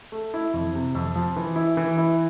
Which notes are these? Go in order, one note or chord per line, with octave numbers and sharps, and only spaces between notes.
A3
E4
F2
C3
F2
F3
E3
E4
E3
E4